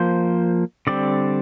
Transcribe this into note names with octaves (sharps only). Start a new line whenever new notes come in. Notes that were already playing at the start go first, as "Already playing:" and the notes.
Already playing: F3 A#3 C5
D3 G3 C4 D5